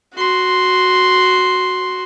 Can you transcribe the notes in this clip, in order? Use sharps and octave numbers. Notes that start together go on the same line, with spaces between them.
F#4 C6